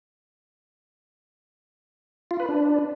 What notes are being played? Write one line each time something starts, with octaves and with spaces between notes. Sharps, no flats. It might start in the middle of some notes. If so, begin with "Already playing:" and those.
F4
B4
D4